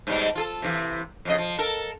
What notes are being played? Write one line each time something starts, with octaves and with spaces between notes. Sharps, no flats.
G#2 B2 G3
F4 G#4 A4
C3 D#3 E3
F2 C#3 D#5
F3
A4 A#4